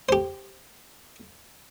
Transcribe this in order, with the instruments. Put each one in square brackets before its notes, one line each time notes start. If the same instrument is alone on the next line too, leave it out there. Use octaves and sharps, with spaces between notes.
[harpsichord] G4 C5